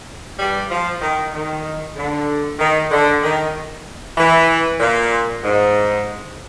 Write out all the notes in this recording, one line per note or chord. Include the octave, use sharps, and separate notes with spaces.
G2 G3
F3
D#3
D#3
D3
D#3
D3
D#3
E3
A#2
G#2